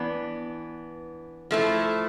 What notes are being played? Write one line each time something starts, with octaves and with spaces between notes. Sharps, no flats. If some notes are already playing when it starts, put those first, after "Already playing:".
Already playing: E3 B3 D4
F3 A3 E4